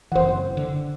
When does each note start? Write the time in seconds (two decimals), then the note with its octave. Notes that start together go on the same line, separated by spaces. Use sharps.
0.12 F#1 E3 C5 F#5
0.57 D3